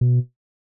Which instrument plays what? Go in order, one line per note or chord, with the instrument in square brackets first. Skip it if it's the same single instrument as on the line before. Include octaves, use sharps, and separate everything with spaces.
[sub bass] B2